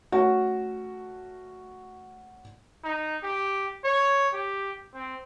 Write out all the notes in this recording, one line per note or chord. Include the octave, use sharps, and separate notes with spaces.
A3 C#4 F#4
D#4
G4
C#5
G4
C4